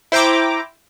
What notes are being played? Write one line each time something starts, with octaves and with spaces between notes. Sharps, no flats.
E4 C5 G5 A#5 D6